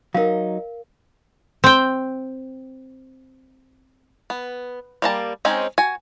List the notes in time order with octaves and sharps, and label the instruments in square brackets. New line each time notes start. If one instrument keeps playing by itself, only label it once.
[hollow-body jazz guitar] F#3 D#4 [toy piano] A#4 F5
[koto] C4 G5
[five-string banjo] B3
G3 A#3 A5
G#3 C4 C#4 D#4
F#4 G#5